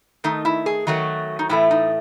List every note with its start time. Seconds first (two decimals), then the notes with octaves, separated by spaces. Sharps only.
0.24 D#3 A3 D#4
0.45 E4
0.66 G#4
0.87 D#3 F#3 A3 F#4
1.39 D#4
1.49 A2 E3 A3 E4
1.71 D#4